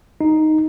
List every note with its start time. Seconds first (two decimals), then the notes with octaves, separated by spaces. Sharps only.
0.21 D#4